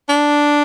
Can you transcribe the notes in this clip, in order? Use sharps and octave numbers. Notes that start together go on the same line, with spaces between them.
D4